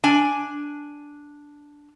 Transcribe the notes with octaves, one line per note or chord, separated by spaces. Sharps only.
D4 G#5